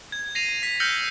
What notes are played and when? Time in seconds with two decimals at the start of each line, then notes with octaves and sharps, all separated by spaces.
0.12 G#6
0.35 A#6 C7 D#7 F7
0.63 B6
0.80 E6 F6 G6 A#6 C#7 F#7